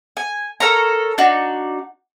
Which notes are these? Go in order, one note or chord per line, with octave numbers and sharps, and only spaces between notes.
G#5
A4 A#4 C#5 A#5
D4 D#4 F#4